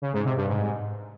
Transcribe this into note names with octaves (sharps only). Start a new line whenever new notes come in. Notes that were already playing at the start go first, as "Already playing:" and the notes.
C#3
G#2
C3
G2
G#2